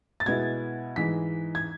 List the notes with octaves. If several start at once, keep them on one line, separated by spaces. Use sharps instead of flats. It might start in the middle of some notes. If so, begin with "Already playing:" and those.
A6
B2 G#3 B3 E4 G#6
G#2 E3 G#3 B6
G#6